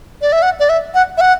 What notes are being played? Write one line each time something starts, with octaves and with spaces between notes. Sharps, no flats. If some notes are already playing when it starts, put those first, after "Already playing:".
D5
E5
F#5
D5
E5
F#5
E5
F#5